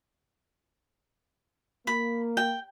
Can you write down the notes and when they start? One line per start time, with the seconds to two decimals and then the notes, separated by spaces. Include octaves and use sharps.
1.87 A#3 B5
2.37 G5